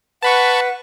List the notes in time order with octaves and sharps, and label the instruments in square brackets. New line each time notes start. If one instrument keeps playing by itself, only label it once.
[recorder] B4 [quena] F#5 [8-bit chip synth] A5 B5 C#6